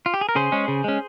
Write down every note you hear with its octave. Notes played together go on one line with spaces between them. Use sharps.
F4
G4
G#4
A#4
C#3 G#4 C5
G#3 C#4
C#3
G#3 C#4